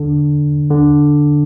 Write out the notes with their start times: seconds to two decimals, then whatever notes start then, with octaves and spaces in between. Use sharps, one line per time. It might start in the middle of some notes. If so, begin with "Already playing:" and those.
Already playing: D3
0.71 D3